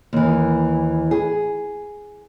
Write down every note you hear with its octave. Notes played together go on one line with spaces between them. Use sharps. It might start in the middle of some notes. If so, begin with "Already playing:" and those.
D#2 E3
G#4